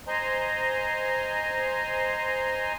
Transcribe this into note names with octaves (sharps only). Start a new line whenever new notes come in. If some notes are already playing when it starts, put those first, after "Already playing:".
C5 D#5 G#5 A#5 C6